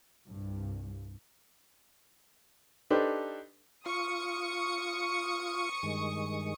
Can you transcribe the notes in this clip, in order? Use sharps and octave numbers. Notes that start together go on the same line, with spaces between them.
C2 G2
D4 D#4 G4 A4 B4 C5
F4 C#6 D#6 C#7
G2 D#3 G#3